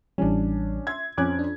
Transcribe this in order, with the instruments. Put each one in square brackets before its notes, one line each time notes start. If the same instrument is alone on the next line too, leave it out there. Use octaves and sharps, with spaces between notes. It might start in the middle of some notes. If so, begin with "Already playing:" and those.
[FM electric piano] A1 E3 G3 [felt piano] C#4 D4
[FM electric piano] E5 C6 [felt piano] G#6
[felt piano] F2 C#4 G#6 [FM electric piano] D6 F#6
[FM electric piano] D4